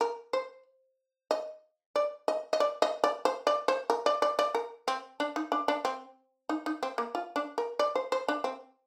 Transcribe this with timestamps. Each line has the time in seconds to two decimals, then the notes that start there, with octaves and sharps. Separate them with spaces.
0.01 A#4
0.33 C5
1.31 D#5
1.96 D5
2.28 D#5
2.53 D#5
2.60 D5
2.82 D#5
3.04 D5
3.25 C5
3.47 D5
3.68 C5
3.90 A#4
4.06 D5
4.22 D5
4.39 D5
4.55 A#4
4.88 C4
5.20 D4
5.36 D#4
5.52 D4
5.68 D4
5.85 C4
6.49 D#4
6.66 D#4
6.83 C4
6.98 A#3
7.15 F4
7.36 D4
7.58 A#4
7.79 D5
7.95 C5
8.12 C5
8.28 D4
8.44 C4